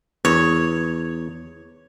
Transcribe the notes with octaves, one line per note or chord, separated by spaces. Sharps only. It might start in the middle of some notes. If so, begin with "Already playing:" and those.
E2 C#5